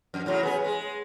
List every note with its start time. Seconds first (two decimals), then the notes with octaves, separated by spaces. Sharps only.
0.14 F2
0.26 A2 C#3 F#3
0.43 B3 G#4
0.64 G#3